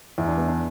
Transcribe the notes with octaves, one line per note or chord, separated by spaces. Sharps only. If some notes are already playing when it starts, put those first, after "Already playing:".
E2 E4
D4
B3
D4